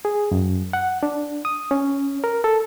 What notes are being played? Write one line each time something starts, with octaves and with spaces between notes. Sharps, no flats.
G#4
F#2
F#5
D4
D#6
C#4
A#4
A4